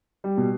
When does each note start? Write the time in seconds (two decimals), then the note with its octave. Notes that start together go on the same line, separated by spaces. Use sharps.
0.24 G3
0.37 B2